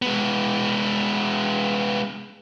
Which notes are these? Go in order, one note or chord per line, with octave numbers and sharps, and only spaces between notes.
G#3 B3